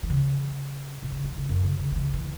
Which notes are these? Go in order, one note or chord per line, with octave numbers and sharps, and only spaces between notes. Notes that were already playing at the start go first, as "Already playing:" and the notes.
E3
C#3
B2
C#3
E3
C#3
F#2
C#3
C#3
E3
C#3
E3